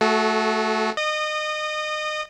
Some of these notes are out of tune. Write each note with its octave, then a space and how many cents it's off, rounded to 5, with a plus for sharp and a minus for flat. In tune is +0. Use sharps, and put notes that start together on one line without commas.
A3 +0 F#4 +0 A4 -35
D#5 -30 D#6 -20